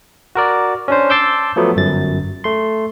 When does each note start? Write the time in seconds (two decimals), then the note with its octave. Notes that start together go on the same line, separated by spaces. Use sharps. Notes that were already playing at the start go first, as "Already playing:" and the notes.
0.35 F#4 A#4 D5
0.88 C#4 D4 C5
1.10 A5 C6 D6 E6 G6
1.56 F3 F#3 A3 B3
1.76 G1 F#2 A6
2.44 A3 C6